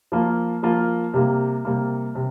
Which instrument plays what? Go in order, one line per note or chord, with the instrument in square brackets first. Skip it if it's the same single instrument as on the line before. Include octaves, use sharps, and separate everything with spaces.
[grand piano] F3 A#3 F4
F3 A#3 F4
C3 G3 A#3
C3 G3 A#3
C3